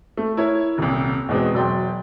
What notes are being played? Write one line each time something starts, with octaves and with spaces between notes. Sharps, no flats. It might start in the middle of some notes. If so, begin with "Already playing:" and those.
A3
E4 A#4 C#5
D#1 C2
E2 B2 G#3 B3 C4
E1 F#3 D5 G5 C6